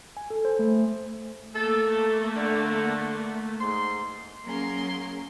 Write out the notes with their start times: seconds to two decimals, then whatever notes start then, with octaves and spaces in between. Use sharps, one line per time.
0.17 G#5
0.30 A4
0.45 C5
0.59 A3
1.55 A3 A#3 A4
2.36 D3
3.60 G#2 C6
4.43 F#3 A#3 C#4 G#4 A#4 C6